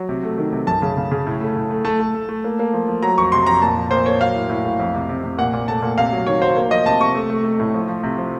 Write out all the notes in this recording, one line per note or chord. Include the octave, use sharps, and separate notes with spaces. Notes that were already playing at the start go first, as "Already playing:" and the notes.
Already playing: F#3
C3
A3
D#3
C3
F#2 A5
C#3
C#3
C#3
A2
A3
A2
A3
A3 A5
A3
A3
A3
A#3
A#3
F3
F3
F#3 A#5
F2 C#6
C3 C6
F2 A#5
A#2 A5
F3
A#2 C5
A#3 C#5
F#3 F5
A2
A2
A2
F2
C3
C3
C3
A#2 F#5
A#2
A3 A5
A#2
C3 F5
F#3
D#3 C#5
F#3 C5
A#3
F3 D#5
C3 A5
C3 C#6
A3
A3
A3
A2
F3
F3
C3
F3